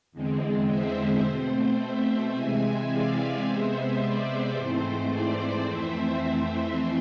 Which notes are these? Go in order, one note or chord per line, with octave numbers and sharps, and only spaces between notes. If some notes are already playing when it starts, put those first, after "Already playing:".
E2 D3 G#3 C4
C5 E5
B2 A3 C4 C5
C5 E5
C3 E3 G#3 C4 E5 G#5
D5 F5
C3 G#3 B3 C5 E5
D5
G#2 E3 A3 C4 C5
D5
F2 E3 A3 C4 C5 E5
C5 E5